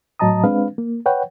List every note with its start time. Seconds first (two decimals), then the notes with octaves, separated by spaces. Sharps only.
0.19 A2 F#3 D#5 A5 A#5 D#6
0.44 G#3 C4 D4 B4 F5
0.78 A#3
1.06 B4 C#5 F#5 G5